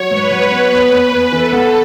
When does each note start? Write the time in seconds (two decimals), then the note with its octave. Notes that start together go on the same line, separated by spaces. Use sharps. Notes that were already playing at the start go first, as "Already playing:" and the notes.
Already playing: F#3 C#5
0.11 G#2 B4
0.31 F#3
0.51 B3
0.72 E2
0.92 E2
1.12 E2
1.32 E3 A4
1.53 B3